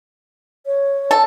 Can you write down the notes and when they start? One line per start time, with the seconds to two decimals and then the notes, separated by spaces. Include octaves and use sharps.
0.66 C#5
1.11 A4